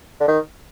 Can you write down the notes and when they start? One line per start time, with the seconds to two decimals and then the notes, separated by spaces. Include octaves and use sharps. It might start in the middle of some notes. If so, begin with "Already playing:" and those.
0.20 D3
0.28 D#3